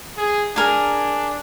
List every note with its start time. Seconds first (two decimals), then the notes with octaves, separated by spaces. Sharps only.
0.17 G#4
0.56 D4 G#4 A#4 G#5